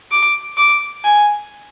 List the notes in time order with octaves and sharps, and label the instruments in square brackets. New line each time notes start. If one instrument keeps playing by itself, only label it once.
[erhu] D6
D6
G#5